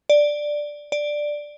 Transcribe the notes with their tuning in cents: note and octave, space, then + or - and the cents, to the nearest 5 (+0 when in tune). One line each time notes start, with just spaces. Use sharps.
D5 +5
D5 +5